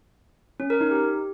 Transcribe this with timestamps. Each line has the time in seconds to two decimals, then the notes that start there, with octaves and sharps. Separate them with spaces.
0.60 C#4
0.70 A#4
0.81 D#4
0.91 G4